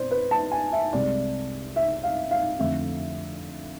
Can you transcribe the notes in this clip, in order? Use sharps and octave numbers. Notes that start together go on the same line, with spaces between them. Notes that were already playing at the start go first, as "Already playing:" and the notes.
Already playing: B2 C4 C5 D5
B4
A5
G#5
E5
C2 C3 G#3 D5
E5
F5
F5
F2 D3 A3 C4 E5